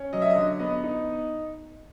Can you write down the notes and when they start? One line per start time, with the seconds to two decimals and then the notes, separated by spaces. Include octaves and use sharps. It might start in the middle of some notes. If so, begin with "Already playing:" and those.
Already playing: C#4
0.13 F#3 D#5
0.22 E5
0.30 D#5
0.36 D3
0.59 B3 D#5
0.84 D#4